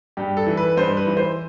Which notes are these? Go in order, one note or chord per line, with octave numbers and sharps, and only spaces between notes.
G2 G4
A4
E3
B4
G2 C5
B4
E3
C5